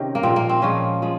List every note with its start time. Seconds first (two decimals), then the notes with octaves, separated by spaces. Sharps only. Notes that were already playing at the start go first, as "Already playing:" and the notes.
Already playing: C3 D#3 C#4
0.15 A#3
0.23 A#2 F3 G#3 C4
0.36 A#3
0.50 C4
0.62 A#2 F3 G#3 C#4
1.02 F3 G#3